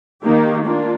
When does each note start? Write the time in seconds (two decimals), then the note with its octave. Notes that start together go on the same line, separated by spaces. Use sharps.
0.23 D#3 A#3 D#4 G4
0.66 A#3 D4 F4